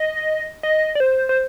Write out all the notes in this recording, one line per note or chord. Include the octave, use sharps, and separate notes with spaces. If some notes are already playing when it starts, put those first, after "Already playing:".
Already playing: D#5
D#5
D5
C5
C5